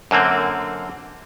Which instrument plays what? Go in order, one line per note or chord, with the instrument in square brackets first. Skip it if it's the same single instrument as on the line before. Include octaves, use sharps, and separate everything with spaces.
[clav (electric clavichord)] F#2 D3 A#3 C4